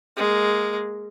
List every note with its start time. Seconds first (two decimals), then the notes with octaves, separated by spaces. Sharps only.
0.17 G#3 A#3